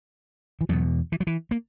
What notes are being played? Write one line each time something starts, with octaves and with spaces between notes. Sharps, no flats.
E3
E2 B2 F#3
E3
F#3
E3
A#3